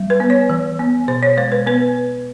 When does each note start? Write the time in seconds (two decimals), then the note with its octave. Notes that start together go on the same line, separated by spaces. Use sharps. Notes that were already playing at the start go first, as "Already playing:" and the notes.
Already playing: G3
0.10 B4
0.20 B3
0.30 C#5
0.50 E3
0.79 B3
1.08 B2 C5
1.23 C#5
1.37 G#3 C5
1.52 B4
1.67 B3 B4